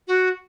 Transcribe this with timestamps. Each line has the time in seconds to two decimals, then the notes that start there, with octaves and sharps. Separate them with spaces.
0.08 F#4